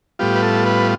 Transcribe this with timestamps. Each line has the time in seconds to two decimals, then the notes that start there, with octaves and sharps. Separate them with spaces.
0.19 A2 G3 B3 F4 G4
0.36 B4
0.42 A4
0.66 B4